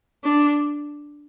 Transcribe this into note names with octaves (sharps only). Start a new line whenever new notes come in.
D4